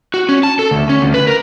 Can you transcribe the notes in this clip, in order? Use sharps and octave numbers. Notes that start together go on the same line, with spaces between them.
F#4
C#4
A5
A4
D2
C#4
D2
B4
A#4